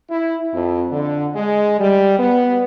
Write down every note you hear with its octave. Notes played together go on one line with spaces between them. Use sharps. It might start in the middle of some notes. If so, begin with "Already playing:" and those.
E4
F2
D3
G#3
G3
B3